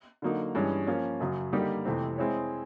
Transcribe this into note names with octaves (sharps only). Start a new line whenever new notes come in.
D3 F#3 A#3 D#4
G2 E3 G#3 C#4
F3 A#3 C#4
F#2 C#3 F#3
D3 G3 A#3 D#4 G4
F2 C3 E3 A3 C4
G#3 C4 E4 G#4 C#5